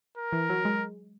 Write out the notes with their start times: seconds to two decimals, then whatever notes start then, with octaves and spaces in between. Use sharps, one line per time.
0.17 A#4
0.33 E3
0.50 F#3
0.65 G#3